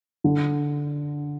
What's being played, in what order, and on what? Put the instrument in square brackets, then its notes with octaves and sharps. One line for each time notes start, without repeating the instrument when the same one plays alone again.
[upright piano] D3